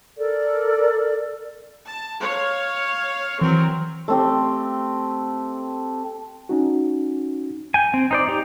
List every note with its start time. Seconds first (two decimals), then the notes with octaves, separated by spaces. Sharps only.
0.17 A4 A#4 D5
1.86 A5
2.21 C#5 F5
3.41 E3 F#3 C4 A#4
4.08 A3 C4 G4
6.49 C#4 D#4 F#4
7.74 G5 G#5
7.94 C4
8.11 D#4 C5 D5
8.28 D#4 G4